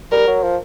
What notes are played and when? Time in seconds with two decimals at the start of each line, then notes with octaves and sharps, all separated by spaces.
0.12 G3 A#4
0.27 F#3
0.43 F3